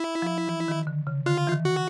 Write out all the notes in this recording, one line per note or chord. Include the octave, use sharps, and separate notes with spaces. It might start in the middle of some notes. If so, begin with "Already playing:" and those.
Already playing: E4
F3
E3
D#3
D3
C#3
D3 F4
E3
D#3
F#4